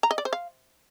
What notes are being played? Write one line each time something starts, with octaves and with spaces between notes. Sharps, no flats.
A#5
D#5
D5
C5
F5